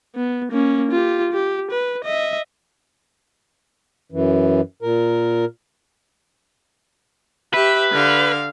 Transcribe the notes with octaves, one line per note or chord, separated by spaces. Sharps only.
B3
A#3 C#4
F4 G4
G4
B4
D#5 E5
F#2 E3
A#2 A#4
G4 B4 E5
D3 F5